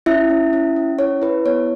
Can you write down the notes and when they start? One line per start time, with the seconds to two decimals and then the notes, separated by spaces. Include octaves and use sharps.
0.06 C#4 E4 E5
0.30 C#4
0.53 C#4
0.76 C#4
0.99 E4 C#5
1.22 E4 B4
1.46 B3 C#5